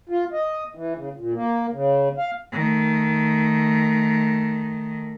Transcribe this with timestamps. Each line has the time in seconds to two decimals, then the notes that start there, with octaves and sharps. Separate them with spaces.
0.09 F4
0.33 D#5
0.75 E3
0.97 C#3
1.16 A#2
1.34 A#3
1.72 C#3
2.18 F5
2.52 D#3 A3